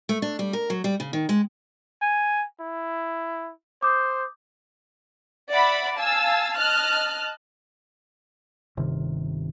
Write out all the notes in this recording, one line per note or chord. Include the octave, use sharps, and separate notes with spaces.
A3
D4
G3
A#4
F#3
G3
C#3
D#3
G#3
G#5
E4
C5 D6 D#6 G6
D5 E5 F#5 B5
F5 G#5 A5 E6
D#5 A5 F6 F#6
G1 C3 D#3